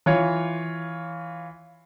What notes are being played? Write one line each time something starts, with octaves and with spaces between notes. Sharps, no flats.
E3 F4 C#5